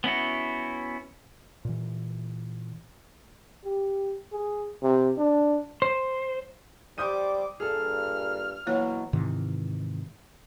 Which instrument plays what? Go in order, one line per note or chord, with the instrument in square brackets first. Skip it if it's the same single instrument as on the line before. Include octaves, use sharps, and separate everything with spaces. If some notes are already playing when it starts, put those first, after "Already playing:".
[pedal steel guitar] B3 C#4 E4 F#4
[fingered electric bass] A#2 E3
[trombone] G4
G#4
C3
D4
[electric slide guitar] C5
[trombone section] G3 [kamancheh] C5 D6 [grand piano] D#6 G6 D#7
[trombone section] G2 A#2 [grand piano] G#4 A4 [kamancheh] F6
[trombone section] B2 F#3 [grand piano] E3 [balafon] A#3 C#5
[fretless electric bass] G#2 C3 D#3 E3